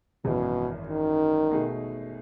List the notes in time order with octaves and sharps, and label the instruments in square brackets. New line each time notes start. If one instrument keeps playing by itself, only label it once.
[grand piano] G#1 F#2 E3 [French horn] B2
[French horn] D#3
[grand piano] B2 A3 D#4 G#4